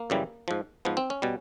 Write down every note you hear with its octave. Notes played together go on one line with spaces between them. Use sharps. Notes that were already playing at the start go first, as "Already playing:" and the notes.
Already playing: A#3
F#2 C#3 E3 G3
G#2 F3
G#2 F3 B3
C4
C#4
B2 G3